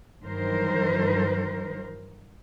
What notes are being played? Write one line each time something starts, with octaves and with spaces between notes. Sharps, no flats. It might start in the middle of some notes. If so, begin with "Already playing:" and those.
G2 D#3 E3 F#3 A#4 C5